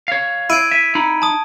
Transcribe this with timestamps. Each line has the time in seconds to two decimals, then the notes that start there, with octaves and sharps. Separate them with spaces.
0.08 C#5 F5
0.50 E4 G#6 D7 D#7
0.71 E5 D#7
0.95 D#4 B5
1.22 A5 D#6